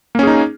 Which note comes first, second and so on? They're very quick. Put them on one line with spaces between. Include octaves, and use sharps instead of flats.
A#3 C#4 G#4 D#4